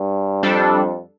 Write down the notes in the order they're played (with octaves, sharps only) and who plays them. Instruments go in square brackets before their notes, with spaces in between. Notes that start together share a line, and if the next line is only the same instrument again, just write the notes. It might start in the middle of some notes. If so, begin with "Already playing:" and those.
Already playing: [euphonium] G2
[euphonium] F2 [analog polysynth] G3 D4 A4